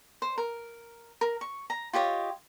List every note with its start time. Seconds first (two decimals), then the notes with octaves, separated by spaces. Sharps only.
0.22 C5
0.38 A#4
1.21 A#4
1.41 C#6
1.70 A#5
1.93 F4 G4 C#5 D#5